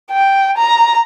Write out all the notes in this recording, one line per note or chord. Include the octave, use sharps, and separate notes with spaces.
G5
A#5